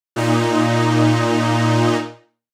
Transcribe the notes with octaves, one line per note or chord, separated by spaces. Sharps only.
A#2 D#4